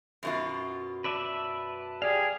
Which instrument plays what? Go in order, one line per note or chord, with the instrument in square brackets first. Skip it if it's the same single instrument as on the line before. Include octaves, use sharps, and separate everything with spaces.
[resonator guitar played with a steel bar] F#2 B2 F4
[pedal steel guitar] B4 D5 E5 [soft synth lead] A5
[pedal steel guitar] G4 F5 [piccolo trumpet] G#4 [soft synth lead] D5